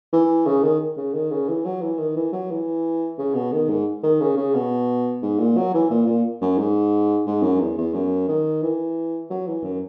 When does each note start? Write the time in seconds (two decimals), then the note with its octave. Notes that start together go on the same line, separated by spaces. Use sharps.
0.13 E3
0.46 C#3
0.63 D#3
0.97 C#3
1.14 D#3
1.31 C#3
1.48 E3
1.65 F#3
1.82 E3
1.99 D#3
2.16 E3
2.33 F#3
2.51 E3
3.18 C#3
3.35 B2
3.52 D#3
3.69 G#2
4.03 D#3
4.21 C#3
4.37 C#3
4.55 B2
5.22 G#2
5.39 A#2
5.57 F#3
5.74 E3
5.90 A#2
6.07 A#2
6.41 F#2
6.58 G#2
7.27 G#2
7.43 F#2
7.60 E2
7.77 E2
7.94 F#2
8.29 D#3
8.63 E3
9.30 F#3
9.47 E3
9.64 F#2